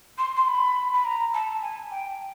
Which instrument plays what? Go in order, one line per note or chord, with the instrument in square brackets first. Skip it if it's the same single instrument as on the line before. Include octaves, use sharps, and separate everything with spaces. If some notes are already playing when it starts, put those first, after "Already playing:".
[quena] C6
C6
B5
B5
A#5
A5
G#5
G5